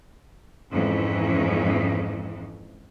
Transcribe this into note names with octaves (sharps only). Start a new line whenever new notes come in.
F2 G#2 E3 C#4